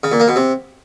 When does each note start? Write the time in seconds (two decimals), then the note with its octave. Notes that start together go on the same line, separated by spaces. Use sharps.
0.04 C#3
0.12 A#2
0.20 A#3
0.28 B2
0.36 C3